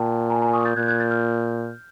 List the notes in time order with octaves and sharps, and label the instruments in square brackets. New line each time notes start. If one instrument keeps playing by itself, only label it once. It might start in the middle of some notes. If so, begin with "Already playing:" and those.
Already playing: [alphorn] A#2 [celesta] G5 A5
[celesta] G#5 A#5
G#5 A#5
C#6 D#6
G6 A6
[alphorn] A#2 [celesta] F#6 G#6
[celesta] G6
F#6 G#6
G6 A6
F6 G6